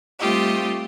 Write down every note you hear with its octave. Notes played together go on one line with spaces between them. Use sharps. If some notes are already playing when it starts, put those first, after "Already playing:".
G3 A3 C4 F4 G4 D#5